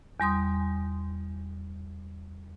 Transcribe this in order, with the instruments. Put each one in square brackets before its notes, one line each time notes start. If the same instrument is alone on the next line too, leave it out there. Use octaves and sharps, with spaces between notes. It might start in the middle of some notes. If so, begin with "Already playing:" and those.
[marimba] E2 G3 C6 D#6